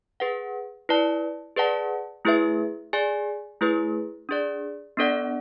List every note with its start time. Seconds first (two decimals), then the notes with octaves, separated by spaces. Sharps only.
0.20 G#4 B4 F#5
0.89 E4 B4 D5 A5
1.56 G#4 B4 D5 F#5 A5
2.25 A3 E4 G#4 B4 E5
2.93 G#4 D5 G#5
3.61 A3 E4 G#4 B4
4.29 D4 G#4 D5
4.97 B3 D4 A4 D5 F#5